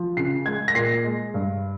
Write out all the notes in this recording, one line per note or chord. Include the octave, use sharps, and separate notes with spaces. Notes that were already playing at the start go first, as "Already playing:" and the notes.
Already playing: F3
C#3 C7
G#3 G#6
A#6
A#2 C7
G#3
G2